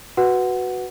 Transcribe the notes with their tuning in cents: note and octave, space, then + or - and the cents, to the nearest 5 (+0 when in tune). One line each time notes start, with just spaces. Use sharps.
F#4 +0 B4 +0 F#5 +0